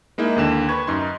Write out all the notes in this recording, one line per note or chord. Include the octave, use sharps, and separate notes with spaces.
G#3 A#3 D#4 E4
D#2 D3 E7
B4 C#6 G#6
F#2 D#4 C6